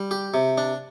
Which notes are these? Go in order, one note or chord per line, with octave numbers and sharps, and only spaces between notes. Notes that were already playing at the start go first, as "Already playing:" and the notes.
Already playing: G3
G4
C3
D4